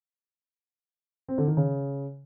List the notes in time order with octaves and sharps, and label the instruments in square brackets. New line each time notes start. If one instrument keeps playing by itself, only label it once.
[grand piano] C4
D3
D#3
C#3